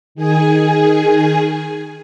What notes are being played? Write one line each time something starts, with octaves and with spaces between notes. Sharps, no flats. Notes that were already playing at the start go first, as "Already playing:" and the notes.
D#3 G#4 G#5